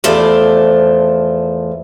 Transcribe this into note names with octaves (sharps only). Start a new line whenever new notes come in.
E2 F3 A3 C5 D5